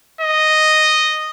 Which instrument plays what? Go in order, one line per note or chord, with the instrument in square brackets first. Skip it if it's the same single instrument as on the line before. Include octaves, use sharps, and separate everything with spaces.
[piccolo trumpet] D#5